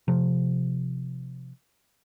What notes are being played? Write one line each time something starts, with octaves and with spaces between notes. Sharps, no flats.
C3 F3